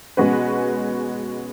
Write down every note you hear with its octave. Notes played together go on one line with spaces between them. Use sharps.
B2 G#3 C#4 F#4 B4